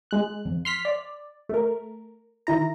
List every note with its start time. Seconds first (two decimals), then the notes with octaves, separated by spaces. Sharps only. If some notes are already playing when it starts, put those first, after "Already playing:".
0.11 G#3 F#6
0.45 F2
0.65 C6 F6 B6
0.85 D5
1.49 A3 A#4
2.47 D#3 E4 A#5